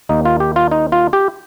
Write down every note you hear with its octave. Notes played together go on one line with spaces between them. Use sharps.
D#2 D#3 A#3 D#4
F4
G4
F4
D#4
F4
G4